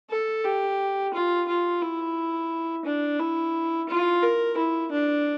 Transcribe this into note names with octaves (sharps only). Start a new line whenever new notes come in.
A4
G4
F4
F4
E4
D4
E4
F4
A#4
E4
D4